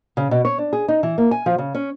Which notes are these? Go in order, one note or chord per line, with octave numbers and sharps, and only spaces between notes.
C#3
B2
C#5
D4
G#4
D#4
E3
A#3
G#5
F3
C#3
C#4